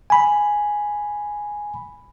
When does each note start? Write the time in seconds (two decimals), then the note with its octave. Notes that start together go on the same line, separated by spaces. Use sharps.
0.10 G#5 B5